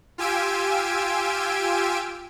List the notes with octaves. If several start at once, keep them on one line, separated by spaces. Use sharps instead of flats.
F4 G4 G#5 E6 D7